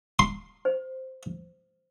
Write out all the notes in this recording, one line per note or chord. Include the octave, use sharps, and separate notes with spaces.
C6
C5